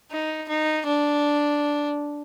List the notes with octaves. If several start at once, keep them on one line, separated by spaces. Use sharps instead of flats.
D#4
D#4
D4